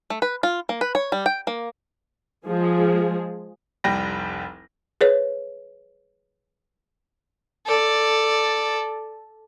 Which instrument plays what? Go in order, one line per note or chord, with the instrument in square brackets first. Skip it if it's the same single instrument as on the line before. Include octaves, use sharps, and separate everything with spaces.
[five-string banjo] A3
B4
F4
A#3
B4
C#5
G3
G5
A#3
[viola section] F3 G#3 G#4
[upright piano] F1 C2 G3 G5 B5 A#6
[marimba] G#4 B4 C#5
[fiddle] A4 D5